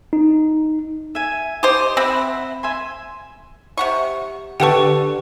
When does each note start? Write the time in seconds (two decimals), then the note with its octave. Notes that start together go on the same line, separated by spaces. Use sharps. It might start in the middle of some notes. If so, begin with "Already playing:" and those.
0.13 D#4
1.15 E5 G#5
1.63 G4 C5 D#5
1.97 C4 E5 F#5 B5
2.63 E5 G#5 C6
3.77 C3 F#5 C#6
4.60 D3 G4 A4 B4 F#5 G5 C#6